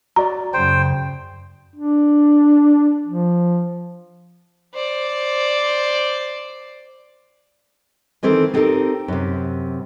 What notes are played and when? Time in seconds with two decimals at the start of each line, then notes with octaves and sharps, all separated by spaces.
0.16 F#4 C#5 D5 A#5
0.54 F#2 C#3 C5 G5
1.76 D4
3.07 F3
4.74 C5 D5
8.23 D#3 E3 C4 E4 A4
8.54 B3 C4 D#4 G4 A4 A#4
9.08 F#2 C3